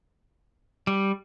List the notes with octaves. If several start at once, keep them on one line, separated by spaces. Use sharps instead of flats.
G3